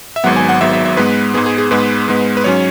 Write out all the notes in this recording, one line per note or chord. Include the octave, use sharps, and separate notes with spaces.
E5
G#1 G#2 F#3 B3 F#5
G#5
F#5
G#1 G#2 F#3 B3 E5
E5
E5
G#2 G#3 B3 B4
G#2 G#3 B3 G#4
G#4
G#4
G#2 G#3 B3 B4
G#2 G#3 B3
B4
G#2 F#3 C#4 C#5